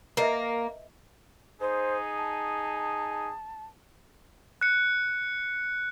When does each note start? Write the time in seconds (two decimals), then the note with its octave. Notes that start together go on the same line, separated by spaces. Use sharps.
0.17 A#3 A#4 B4 D#5 E5
1.61 D#4 G#4 C5
2.17 A5
4.61 F#6 C#7